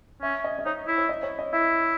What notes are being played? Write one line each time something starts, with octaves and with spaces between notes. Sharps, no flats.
C#4 E5
D#5
D#5
D#4 C#5
E4
C#5
D#5
C#5
D#5
E4 E5